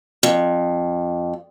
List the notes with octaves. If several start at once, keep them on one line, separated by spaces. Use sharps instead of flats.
F2